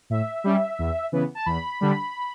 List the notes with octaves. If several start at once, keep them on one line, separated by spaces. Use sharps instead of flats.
A2 E5
G3 C#4
E2
C#3 E3 B3
A5
E2 B5
D3 G3 D4